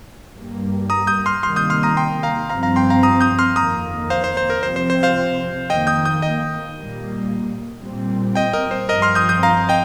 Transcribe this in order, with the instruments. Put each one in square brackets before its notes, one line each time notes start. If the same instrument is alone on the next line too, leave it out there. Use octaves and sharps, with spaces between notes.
[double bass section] G2 G3 A#3
[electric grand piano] A#5 D#6
D#6 G6
C6 F6
[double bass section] C3 D#3 G3 A#3 [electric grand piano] C6 F6
[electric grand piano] D#6 G6
C6 F6
A#5 D#6
G5 C6
F5 A#5
[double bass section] G2 F3 C4 [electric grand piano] F5 A#5
[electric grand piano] F5 A#5
G5 C6
F5 A#5
A#5 D#6
D#6 G6
C6 F6
[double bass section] F2 D#3 A#3 [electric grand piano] A#5 D#6
[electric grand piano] C5 F5
C5
C5
A#4
[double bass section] C3 F3 C4 [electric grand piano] C5
[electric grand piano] C5
C5
C5 F5
[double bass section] F2 D#3 A#3 [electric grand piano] D#5 G5
[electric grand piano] D#6 G6
D#6 G6
D#5 G5
[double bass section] A#2 G3 A#3
A#2 G3 C4
[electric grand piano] D#5 G5
A#4 D#5
C5
[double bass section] G2 F3 C4 [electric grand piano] A#4 D#5
[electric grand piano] C6 F6
D#6 G6
D#6 G6
F5 A#5
D#5 G5